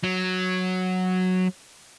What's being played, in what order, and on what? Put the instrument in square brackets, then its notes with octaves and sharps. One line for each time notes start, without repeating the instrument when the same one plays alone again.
[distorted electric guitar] F#3